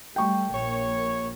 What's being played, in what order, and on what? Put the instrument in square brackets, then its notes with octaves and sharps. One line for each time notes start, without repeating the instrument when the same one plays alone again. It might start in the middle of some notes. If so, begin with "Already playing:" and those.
[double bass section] G3 A3 [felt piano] G5 C#6
[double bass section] A#1 A#3 [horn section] C#5